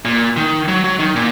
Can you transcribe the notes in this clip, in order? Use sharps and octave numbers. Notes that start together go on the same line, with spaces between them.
A#2
D#3
F#3
F#3
D#3
A#2